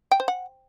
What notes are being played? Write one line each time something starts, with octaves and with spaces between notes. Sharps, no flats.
G5
C5
F#5